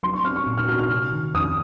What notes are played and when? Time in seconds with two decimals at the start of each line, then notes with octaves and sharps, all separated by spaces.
0.03 F#3 C6
0.14 C#6
0.25 C4 F6
0.36 C#6
0.47 A#2
0.57 F6
0.68 F#4 F6
0.79 F6
0.90 C3
1.12 D#3
1.34 F2 D#6